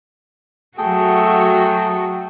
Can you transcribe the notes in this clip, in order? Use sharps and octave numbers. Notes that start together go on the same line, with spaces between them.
F#3 A3 F#4 G#4 A4 G5